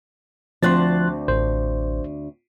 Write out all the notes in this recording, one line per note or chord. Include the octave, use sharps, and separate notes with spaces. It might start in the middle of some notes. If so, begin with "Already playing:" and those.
D2 F3 C4 D4 C6 F#6 A6
A1 C5